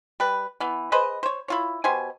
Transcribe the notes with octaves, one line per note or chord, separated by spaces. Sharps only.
G3 B4
E3 B3
G#4 B4 C5 D#5
C5 C#5
E4 F4 C#5
B2 G4 C5 G#5